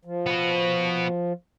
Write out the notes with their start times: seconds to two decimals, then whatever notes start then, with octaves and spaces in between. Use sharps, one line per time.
0.05 F3
0.26 B3 F#4